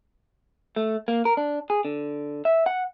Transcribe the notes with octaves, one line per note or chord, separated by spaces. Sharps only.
A3
A#3
A#4
D4
G#4
D3
E5
F#5